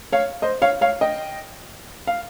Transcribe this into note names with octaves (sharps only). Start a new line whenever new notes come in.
C#5 F5
C5 D#5
C#5 F5
C#5 F5
D#5 G5
F5